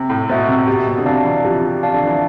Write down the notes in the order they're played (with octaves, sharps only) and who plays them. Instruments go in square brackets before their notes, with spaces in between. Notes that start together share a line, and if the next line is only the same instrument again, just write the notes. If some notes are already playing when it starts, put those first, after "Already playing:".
Already playing: [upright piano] C3
A2
[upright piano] B2 [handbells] C5 E5
[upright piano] C3
[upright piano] B2 [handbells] G4
[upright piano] B2
D3
[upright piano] C3 [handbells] D5 F5 A5
[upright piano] E3
[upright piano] F3 [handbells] G4
[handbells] D5 F5 A5
[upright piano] D3
E3